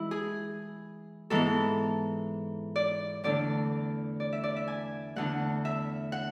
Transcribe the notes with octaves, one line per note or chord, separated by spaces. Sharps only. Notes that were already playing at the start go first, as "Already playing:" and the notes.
Already playing: E3 G#3 E4
G#4
G#2 E3 B3 A4
D5
E2 D3 A3 D5
D5
E5
D5
E5
G#5
E2 D3 A3 F#5
E5
F#5